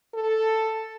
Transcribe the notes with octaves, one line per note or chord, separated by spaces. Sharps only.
A4